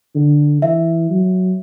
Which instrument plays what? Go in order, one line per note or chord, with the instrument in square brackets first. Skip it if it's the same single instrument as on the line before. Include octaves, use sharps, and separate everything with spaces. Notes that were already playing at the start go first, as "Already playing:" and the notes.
[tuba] D3
[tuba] E3 [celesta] E5
[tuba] F#3